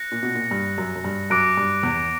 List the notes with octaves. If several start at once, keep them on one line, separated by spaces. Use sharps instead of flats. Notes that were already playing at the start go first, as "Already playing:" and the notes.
Already playing: F#6 A#6 C#7
A#2
B2
A#2
G2
F#2
F#2
G2
F#2 D6 F#6 A#6 D7
G2
E2